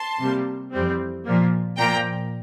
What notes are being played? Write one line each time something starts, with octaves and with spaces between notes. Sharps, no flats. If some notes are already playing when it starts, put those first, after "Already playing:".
Already playing: A5 C6
C3 G3 A#3
F2 E3 G3 C4
A#2 F3 A#3
A#2 F3 A#3 G5 A#5